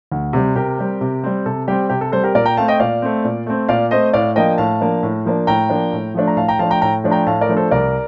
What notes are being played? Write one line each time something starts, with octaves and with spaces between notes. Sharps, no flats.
D2
C3 G3
C3 G4 A#4
G3 C4
C3
G3 C4
C3 A4
G3 C4 G4
C3 G4
A4
G3 C4 A4 C5
G4 A#4
A#2 A#4 D5
G5 A#5
A3 C4 F5 A5
D#5 G5
A#2 D5 F5
A3 C4
A#2
A3 C4
A#2 D5 F5
A3 C4 C5 D#5
A2 D5 F5
F3 A#3 D4 D#5 G5
A2 F5 A5
F3 A#3 D4
A2
F3 A#3 D4
A2 G5 A#5
F3 A#3 D4
A2
F3 A3 D4
A#5
A2 F5 A5
G5 A#5
F3 A3 D4 F5 A5
G5 A#5
A2 G5 A#5
F3 A3 D4
G5 A#5
A2 F5 A5
A#4 D5
F3 A3 D4
A4 C5
C2 A#4 D5